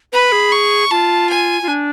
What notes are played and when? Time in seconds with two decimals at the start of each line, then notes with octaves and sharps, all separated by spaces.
0.13 B4 B5
0.32 G#4
0.52 C#6
0.91 F4 A5
1.29 G#5
1.62 F4
1.68 D4